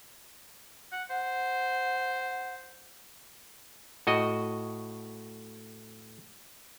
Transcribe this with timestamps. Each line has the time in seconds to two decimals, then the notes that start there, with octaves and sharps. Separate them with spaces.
0.92 F#5
1.10 C5 F#5
4.07 A2 F#4 D#5